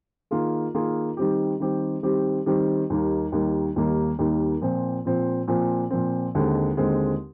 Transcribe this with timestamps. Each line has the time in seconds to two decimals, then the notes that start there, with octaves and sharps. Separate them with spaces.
0.31 D#3 A#3 F4 G#4
0.75 D#3 A#3 F4 G#4
1.17 D#3 G3 C4 G4
1.60 D#3 G3 C4 G4
2.03 D#3 G3 C4 G4
2.46 D#3 G3 C4 G4
2.90 D#2 D#3 G3 A#3
3.32 D#2 D#3 G3 A#3
3.76 D#2 D#3 G3 A#3
4.19 D#2 D#3 G3 A#3
4.61 A#2 F3 C4
5.05 A#2 F3 C4
5.48 A#2 F3 C4
5.91 A#2 F3 C4
6.35 D#2 D3 G#3 C4
6.77 D#2 D3 G#3 C4